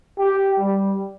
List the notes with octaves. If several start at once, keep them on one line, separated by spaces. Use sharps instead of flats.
G4
G3